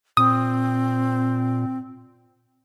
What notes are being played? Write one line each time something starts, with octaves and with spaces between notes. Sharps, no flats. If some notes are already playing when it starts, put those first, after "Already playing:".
A#2 C4 D#6